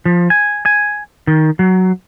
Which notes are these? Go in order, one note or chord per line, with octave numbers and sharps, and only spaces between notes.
F3
G#5
G#5
D#3
F#3